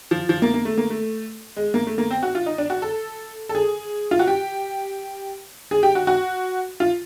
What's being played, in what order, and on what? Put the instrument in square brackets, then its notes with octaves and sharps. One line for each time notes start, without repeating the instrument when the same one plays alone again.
[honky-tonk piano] F3
F3
A#3
A#3
A3
A#3
A3
G#3
A#3
A3
A#3
C4
F#4
F4
D#4
D4
F#4
A4
A4
G#4
F4
F#4
G4
G#4
G4
F#4
F#4
F4